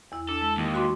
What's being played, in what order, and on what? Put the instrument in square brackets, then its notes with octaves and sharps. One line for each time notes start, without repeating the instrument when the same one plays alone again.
[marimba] E2 E4
[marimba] D4 [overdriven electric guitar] A4
[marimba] G#3
[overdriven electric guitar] D#2
[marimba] F#4 C6 D6